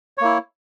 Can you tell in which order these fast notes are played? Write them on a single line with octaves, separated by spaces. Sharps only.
C#5 A#3 E4